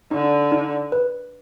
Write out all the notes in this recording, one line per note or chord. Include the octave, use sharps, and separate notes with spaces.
D3 D#4
D#4
B4